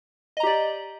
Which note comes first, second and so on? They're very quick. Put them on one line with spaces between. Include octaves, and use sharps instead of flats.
D#5 A#5 G4 D5